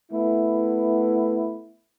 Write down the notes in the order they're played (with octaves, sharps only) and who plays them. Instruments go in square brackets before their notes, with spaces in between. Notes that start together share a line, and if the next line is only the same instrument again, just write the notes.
[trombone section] A3 B3 E4